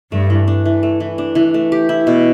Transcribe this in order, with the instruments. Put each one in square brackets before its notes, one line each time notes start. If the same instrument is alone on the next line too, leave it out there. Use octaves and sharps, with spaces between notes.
[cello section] G2 [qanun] A3
[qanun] E3
D4
E3
A3
E3
D4
E3
A3
G4
E4
B2